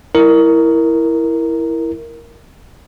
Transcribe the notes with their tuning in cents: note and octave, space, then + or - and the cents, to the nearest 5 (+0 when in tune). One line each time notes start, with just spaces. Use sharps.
E4 +0 A#4 +0